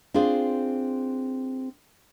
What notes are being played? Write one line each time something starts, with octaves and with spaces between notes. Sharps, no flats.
C4 D4 F4 G#4 C5